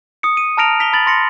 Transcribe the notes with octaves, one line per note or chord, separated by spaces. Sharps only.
D#6 C#7
D#7
A5 A#5 F6 A#6 D7 F7
B6 F7 G7
B5 A6 F#7
C6 A#6 C#7